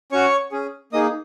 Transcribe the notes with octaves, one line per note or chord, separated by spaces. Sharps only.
C#4 F#4 C#5 C#6
C#4 G#4
A#3 D#4 G#4 D#5 D#6